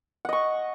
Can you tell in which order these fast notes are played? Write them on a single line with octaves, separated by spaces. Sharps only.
F#5 D#5 C#6